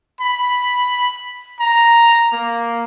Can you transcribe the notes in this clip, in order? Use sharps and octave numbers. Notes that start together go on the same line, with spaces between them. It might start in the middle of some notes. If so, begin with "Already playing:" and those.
B5
A#5
A#3